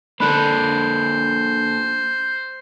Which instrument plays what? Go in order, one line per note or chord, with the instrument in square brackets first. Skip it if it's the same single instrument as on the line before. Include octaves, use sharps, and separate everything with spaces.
[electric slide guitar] A#3 D4 A4 [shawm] C5 [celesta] B5 F#6